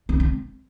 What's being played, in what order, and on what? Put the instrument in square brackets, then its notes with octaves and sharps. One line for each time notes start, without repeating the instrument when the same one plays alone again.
[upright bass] C4
C4